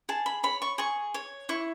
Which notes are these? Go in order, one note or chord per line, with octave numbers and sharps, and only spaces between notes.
G#4 A5
B5
C#5 B5
C#6
G#4 C#6
C#5
E4 C#6